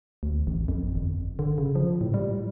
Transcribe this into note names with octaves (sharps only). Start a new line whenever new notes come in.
D2
A1
F2
G1
D3
C#3
F3
A2
G3